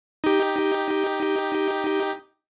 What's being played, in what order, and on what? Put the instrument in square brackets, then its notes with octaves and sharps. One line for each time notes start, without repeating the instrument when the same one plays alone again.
[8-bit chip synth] D#4 G4